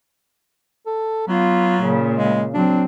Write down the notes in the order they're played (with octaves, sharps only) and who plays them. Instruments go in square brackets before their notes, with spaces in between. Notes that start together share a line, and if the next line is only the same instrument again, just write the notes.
[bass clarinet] A4
[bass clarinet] F#3 [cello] B3 F4
[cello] A#2 C#3
[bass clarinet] G#3
[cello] F#3 C4 [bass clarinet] D4